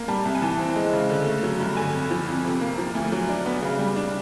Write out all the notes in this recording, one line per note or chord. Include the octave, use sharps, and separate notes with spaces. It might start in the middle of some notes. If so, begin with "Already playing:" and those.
Already playing: A#3
G3 A5
C2
G#5
E3 A5
C4
G#3
C#3
D3
A3
F#3
G2
D3 G#5
F2
F3
F2
C3
A#3
F3
D2
F#3
D4
B3
C#3
G3
D4